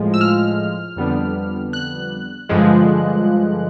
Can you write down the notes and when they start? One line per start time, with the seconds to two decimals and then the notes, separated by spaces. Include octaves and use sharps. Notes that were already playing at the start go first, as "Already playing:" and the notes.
Already playing: A2 F3 G#3
0.14 E6
0.21 F6
0.96 F2 D3 G3 B3 D4
1.73 F#6
2.49 G2 D3 F3 G#3